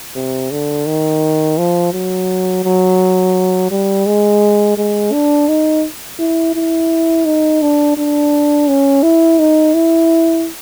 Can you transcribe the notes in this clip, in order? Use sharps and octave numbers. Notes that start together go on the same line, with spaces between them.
C3
D3
D#3
F3
F#3
F#3
G3
G#3
G#3
D4
D#4
E4
E4
D#4
D4
D4
C#4
E4
D#4
E4